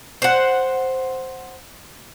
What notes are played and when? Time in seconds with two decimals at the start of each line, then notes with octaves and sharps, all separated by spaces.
0.22 C5 F#5